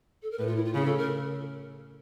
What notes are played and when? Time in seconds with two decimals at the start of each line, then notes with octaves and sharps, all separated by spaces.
0.23 A4
0.31 A#4
0.39 A2 B4
0.47 F4
0.56 E4
0.65 F4
0.74 C#3 G#4
0.86 A4
0.98 A#4